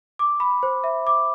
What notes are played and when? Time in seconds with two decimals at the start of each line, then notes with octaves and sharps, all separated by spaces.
0.19 D6
0.40 B5
0.63 C5
0.84 E5
1.07 D6